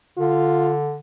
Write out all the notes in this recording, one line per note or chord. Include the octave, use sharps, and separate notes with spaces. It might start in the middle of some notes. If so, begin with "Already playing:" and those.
D3 F4